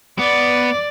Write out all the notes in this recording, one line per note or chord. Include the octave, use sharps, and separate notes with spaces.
B3 D5